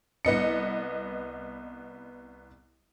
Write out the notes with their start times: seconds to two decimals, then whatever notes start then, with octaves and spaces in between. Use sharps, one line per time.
0.25 C2 B3 D#5 C#7